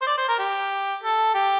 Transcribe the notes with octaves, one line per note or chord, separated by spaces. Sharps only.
C5
D5
C5
A#4
G4
A4
G4